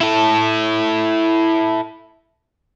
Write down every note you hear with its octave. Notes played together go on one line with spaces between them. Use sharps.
E4 A4